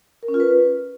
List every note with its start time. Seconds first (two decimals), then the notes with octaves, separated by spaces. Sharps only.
0.23 A#4
0.28 C#4
0.34 F4
0.40 B4